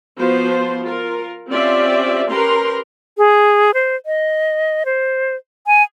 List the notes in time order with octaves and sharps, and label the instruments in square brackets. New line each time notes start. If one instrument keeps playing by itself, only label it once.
[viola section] F3 B3 F4 F#4 C5
F4 A#4
C4 C#4 F4 G4 D5 E5
C#4 G4 A#4 B4 A#5 C6
[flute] G#4
C5
D#5
C5
G#5